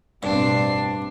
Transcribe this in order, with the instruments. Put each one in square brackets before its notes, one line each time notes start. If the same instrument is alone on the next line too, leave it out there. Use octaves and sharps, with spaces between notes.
[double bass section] A1 B2 C4 [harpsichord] G2 [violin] D4 C7